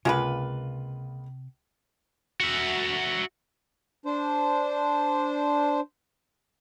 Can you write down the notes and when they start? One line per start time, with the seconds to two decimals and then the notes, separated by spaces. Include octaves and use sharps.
0.05 C#2 C3 G#3 A#3 F4 B4
2.40 F#4 E5
4.06 D4 C5